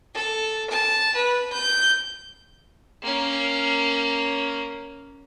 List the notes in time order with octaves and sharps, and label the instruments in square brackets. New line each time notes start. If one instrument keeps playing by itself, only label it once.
[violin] A4
A5
B4
G6
[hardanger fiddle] A#3 C#4